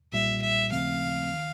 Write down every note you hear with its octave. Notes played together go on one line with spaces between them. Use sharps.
B1 A#2 G3 E5
E5
D#2 C#3 F3 A3 C4 F5
D#3